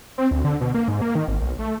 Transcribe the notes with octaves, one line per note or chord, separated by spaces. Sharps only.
C4
D2
D3
B2
A#3
G#2
A#3
D#3
G#1
B1
A3